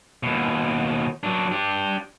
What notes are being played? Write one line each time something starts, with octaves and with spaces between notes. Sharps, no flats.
D#2 B2
F#3 D4
D4 G4